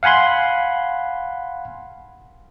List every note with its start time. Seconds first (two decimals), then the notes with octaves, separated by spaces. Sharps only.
0.03 F5 F#5 G#5 B5 C6